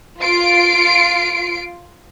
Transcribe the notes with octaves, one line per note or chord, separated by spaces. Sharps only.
F4 C7 D7